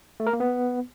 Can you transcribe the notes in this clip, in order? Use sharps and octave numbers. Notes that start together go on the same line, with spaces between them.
A3
A#4
A#3
B3